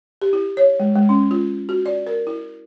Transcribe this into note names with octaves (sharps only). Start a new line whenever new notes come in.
G4
E4
C#5
G#3
G#3
C#4
F4
F#4
D5
A#4
E4